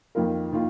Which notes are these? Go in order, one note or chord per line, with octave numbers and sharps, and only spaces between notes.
F2 D#3 A#3 F4 A#4
D#3 A#3 F4